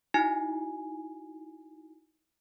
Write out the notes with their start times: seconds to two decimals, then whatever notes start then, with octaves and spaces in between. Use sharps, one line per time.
0.14 D#4 E4 F#4 G#5